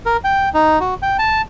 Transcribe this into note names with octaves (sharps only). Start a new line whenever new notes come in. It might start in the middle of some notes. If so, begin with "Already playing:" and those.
A#4
G5
D#4
F#4
G5
A5